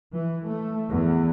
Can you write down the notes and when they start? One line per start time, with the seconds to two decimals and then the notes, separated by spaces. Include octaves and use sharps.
0.14 E3
0.44 A3
0.90 E2